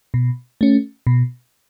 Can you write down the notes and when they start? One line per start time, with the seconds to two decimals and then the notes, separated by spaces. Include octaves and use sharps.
0.14 B2
0.61 A3 C#4
1.07 B2